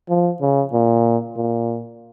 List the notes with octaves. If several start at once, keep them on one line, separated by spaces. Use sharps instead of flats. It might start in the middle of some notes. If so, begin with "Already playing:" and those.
F3
C#3
A#2
A#2